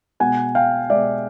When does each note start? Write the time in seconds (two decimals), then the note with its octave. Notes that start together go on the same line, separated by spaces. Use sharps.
0.20 B2 G#3 F#5 G#5
0.55 F5 G5
0.90 B2 G#3 D5 E5